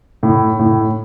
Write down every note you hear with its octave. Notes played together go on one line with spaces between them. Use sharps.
A2
A2